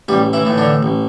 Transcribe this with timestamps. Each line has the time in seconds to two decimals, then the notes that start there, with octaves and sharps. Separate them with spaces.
0.08 A1 G3 G4
0.33 E3 E4
0.45 A2 E3
0.58 D3 D4
0.83 A1